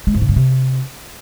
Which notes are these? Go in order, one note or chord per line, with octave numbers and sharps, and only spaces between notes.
G#3
G#2
C#3
G2
C3